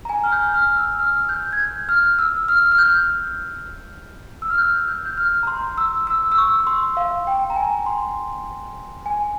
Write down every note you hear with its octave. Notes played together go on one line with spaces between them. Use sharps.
A#5
G#5
F6
G6
F6
E6
F6
G6
G#6
G6
F6
E6
F6
F6
G6
E6
F6
G6
G6
G6
F6
A#5
C6
E6
E6
E6
C#6
C6
F5
G5
A#5
G#5
C6
G#5